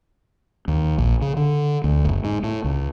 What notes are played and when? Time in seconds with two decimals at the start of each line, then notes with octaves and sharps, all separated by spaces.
0.68 D#2
0.98 A#1
1.21 C#3
1.36 D3
1.84 D2
2.05 F#1
2.24 G#2
2.43 A2
2.64 C#2